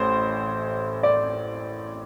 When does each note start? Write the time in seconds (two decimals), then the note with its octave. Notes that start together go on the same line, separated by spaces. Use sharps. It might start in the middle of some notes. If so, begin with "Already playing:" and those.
Already playing: A1 A2 C5
1.03 D5